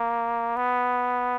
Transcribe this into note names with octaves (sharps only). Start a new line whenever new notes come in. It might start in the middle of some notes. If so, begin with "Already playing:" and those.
Already playing: A#3
B3